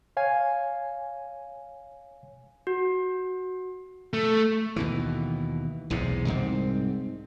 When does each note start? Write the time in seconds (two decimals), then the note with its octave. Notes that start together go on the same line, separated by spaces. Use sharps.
0.17 C#5 F5 G#5
2.67 F#4
4.13 A3
4.76 D#2 B2 E3
5.90 B1 E2 G#2 C3
6.27 C2 G#2 C4